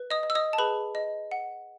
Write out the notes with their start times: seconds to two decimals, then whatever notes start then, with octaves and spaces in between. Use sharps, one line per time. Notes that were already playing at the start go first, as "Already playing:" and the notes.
Already playing: B4
0.11 D#5 D#6
0.23 D#5
0.30 E6
0.35 D#5 D#6
0.53 A5
0.58 G#4 B4 B5
0.95 D#5
1.31 F#5